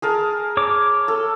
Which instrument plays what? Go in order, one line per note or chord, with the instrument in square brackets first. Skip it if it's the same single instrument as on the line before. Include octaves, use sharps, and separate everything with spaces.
[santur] G#4 A#4 A5
[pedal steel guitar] C#5 D6
[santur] A4